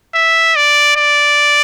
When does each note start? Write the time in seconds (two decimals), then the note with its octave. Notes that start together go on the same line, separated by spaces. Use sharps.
0.15 E5
0.56 D5
0.96 D5